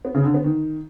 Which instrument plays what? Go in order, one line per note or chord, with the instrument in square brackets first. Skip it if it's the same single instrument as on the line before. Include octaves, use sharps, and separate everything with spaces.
[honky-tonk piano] B3
C#3
D3
B3
D#3